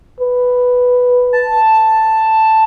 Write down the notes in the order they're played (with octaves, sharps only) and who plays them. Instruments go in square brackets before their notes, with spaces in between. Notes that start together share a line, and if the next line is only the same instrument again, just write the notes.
[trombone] B4
[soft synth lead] A5